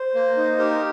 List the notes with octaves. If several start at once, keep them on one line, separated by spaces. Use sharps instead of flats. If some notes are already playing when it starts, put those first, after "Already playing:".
Already playing: C5
A#3
D#4
G4 A#4